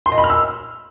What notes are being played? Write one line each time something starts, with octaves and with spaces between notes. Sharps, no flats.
C6
D#5
B5
F6
E6